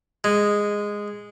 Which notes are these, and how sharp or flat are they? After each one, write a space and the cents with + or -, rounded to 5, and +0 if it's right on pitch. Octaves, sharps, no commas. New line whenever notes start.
G#3 -10